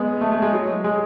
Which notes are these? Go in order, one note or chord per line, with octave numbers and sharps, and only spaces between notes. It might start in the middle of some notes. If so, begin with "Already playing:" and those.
Already playing: G#3 B3
A3
A3
G#3
F#3
G#3